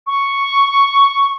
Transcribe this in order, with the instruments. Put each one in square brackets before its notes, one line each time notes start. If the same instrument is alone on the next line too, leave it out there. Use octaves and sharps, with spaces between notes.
[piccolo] C#6